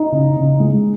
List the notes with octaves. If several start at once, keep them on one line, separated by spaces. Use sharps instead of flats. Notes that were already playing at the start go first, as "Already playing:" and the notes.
Already playing: D#4
C#3
C#3
G#3